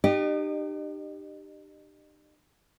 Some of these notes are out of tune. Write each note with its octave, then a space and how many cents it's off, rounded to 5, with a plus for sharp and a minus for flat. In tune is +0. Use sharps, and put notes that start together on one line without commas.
D#4 -45 G4 +0 D#5 -35